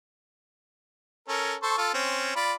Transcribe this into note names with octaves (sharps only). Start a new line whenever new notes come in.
C#4 A4 A#4
A4 C5 C#6
F4 A4
C4 C#4
F4 D5 B5